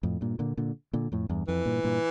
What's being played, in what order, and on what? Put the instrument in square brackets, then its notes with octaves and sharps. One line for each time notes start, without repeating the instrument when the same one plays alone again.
[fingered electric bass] F2 A2
G2 A#2
A#2 D3
A#2 D3
A#2 D3
F2 A2
E2 G2
[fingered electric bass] F2 [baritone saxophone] E3
[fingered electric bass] G2 A#2
G2 A#2